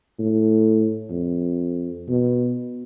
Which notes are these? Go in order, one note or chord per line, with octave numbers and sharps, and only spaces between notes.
A2
F2
B2